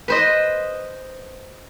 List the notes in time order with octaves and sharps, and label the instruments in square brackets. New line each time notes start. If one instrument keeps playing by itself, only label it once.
[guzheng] B4 C5 D#5